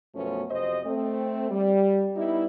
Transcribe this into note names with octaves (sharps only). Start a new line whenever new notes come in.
F#2 B2 F3 A3 B3 C#4
F2 C3 F#3 C5 D#5
A3 C4
G3
G3 B3 D#4 E4